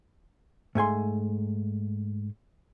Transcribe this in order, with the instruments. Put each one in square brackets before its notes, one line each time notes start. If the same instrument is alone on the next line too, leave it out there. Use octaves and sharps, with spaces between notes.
[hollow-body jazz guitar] G#2 A3 G#5 C6